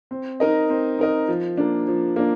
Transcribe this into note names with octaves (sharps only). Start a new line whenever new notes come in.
C4
D#4 A#4 D#5
C4
D#4 A#4 D#5
F3
A#3 D4
F3
A#3 D4